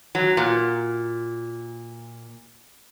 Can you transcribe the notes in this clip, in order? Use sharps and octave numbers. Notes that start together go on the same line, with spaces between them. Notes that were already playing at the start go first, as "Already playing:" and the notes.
F#3
A#2